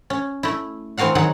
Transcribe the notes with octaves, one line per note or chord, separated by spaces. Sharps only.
C#4
A3 E4
E3 C4 F#4 A#4 F5 F#5
D#3 F#3 F#4 G#4 F#5